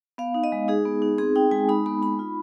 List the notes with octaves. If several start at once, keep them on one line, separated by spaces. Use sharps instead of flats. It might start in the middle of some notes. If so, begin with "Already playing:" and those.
B3 F5
D#4
D#5
G#3
D#4 G#4
B3
D#4
C4 G#4
D#4 G5
G#3 G#5
D#4 B5
B3 B5
D#4 B5
F4